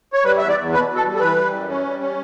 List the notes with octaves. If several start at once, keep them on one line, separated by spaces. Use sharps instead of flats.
C#5
G3 B4
E2 E5
D5
E2
B2 B4
B2
A4
G3
A4
E3 B4
G3
F#2
C#4
G3
C#4